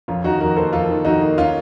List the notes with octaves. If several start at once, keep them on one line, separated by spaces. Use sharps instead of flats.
F2 C#4 F4
D#3 D#4 F#4
F2 F#4 A#4
A#3 A4 C5
F2 F4 A4
D#3
F2 D#4 F#4
A#3
C#4 F4